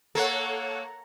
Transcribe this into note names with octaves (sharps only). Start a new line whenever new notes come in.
A#3 A4 C#5 F#5